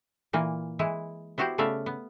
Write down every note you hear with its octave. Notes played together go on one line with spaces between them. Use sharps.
A#2 E3 A#3
E3 G#3 E4
B3 E4 F#4 G4 C5
C#3 A3 B3 D5 E5 F5
B3